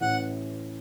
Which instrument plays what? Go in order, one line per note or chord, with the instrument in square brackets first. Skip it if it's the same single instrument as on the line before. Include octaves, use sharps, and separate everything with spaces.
[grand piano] A1 A2 E3 [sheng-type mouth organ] F#5